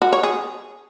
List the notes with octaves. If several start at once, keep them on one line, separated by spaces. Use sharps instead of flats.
F#4
C#5
G#4